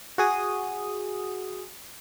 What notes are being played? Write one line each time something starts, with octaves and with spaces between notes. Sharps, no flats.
F#4 G#4 D#6